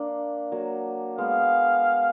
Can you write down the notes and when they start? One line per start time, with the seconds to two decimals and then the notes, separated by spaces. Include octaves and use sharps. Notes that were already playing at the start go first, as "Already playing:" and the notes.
Already playing: A#3 D4
0.52 F#3 A#3
1.18 G#3 B3 F5